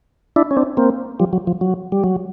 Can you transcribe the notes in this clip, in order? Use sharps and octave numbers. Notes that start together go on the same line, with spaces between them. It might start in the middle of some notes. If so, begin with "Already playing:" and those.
D4 E4
C#4
C4 D4
A#3 C4
F3 G3
F#3
F3
F#3
G3
F#3